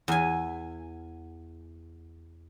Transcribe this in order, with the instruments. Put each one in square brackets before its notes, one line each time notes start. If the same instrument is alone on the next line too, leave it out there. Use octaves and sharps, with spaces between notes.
[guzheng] E2 G#5